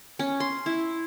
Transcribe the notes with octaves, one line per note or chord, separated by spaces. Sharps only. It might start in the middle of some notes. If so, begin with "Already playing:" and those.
C#4
C6
E4